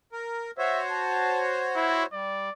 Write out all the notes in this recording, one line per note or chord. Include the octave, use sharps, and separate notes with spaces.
A#4
F#4 C5 C#5 E5
A5
E4
G3 D5